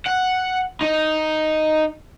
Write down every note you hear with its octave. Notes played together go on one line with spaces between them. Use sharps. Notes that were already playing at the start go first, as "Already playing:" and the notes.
F#5
D#4